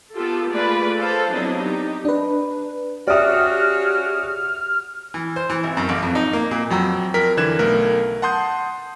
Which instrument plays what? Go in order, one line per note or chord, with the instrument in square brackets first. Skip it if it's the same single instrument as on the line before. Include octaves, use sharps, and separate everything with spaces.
[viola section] B3 F4 G4 A4
A3 A#3 F4 G#4 B4 D5
A4 C5 F5
F#3 B3 C4 D4 E4 D#5
D#4 G4
[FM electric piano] D4 B4
[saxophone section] C#3 F#4 [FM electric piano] G4 [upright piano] D5 E5 D#6 [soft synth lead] F6
[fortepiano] E3
C5
E3
G#1
F#2
A1
F2
D#4
A#3
A#2
[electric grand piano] F2 F#3 G5 A#5 E6
F2 A#4 B6
D3 E3 F#6 G#6 E7
B1 A3 A#4
F#5 A5 C6 D#6 G6